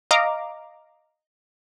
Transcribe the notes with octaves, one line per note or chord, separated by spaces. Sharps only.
D#5 F5 A#5 D6